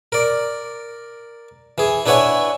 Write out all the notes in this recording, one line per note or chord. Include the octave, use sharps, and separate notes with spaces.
A#4 D5
E3 G#4
D4 E4 B4 C#5 F#5 G#5